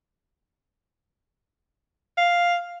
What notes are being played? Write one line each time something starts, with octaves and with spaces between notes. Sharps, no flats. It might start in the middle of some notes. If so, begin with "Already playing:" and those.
F5